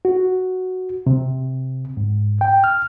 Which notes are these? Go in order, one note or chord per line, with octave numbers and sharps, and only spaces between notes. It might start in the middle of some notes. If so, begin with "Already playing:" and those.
F#4
C3
G#2
G5
F6